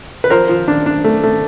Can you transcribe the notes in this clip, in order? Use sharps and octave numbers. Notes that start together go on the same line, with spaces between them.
B4
F3 A#4 C5
F3
D4
D4
A3
A3